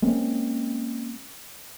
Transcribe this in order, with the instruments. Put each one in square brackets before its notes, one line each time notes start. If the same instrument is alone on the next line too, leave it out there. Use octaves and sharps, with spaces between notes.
[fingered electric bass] G#3 A#3 C4 C#4